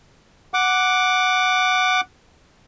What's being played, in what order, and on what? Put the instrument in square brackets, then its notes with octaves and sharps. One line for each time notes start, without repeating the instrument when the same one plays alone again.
[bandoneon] F#5 D6